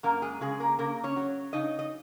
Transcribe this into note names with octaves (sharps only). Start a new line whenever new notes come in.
F#2 A#3 A#4
G#3 G#4
C#3 G#3 G#4
A#3 A#4
C#3 A#3 A#4
C#4 C#5
F#3
C#3 D#4 D#5
D#5